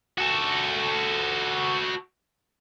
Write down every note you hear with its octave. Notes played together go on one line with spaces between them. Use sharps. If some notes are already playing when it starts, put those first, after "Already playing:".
F#4 A4